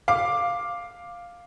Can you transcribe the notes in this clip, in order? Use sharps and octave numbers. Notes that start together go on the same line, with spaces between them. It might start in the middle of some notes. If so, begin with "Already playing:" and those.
F5 D6